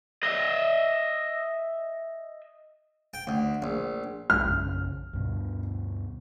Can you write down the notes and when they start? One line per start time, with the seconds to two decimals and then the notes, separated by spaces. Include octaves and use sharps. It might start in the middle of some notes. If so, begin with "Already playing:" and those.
0.23 D#5 E5
3.14 G5
3.27 D2
3.62 A#1
4.30 C2 G#3 F6
4.47 A#1 F#2 C#3
5.13 D2 G2 B2